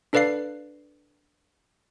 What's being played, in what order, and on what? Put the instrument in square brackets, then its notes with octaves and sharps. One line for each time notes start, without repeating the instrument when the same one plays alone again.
[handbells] D4 A4 B4 D5 F5 C7